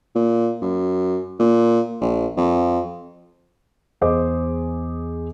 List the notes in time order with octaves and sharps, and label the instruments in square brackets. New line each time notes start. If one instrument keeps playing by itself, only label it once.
[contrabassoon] A#2
F#2
A#2
A#1
F2
[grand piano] E2 G#4 C5 D#5 D6